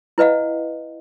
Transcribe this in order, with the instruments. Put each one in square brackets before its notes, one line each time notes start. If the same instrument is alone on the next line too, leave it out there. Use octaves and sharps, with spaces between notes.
[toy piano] E4 B4 D#5 F5 F#5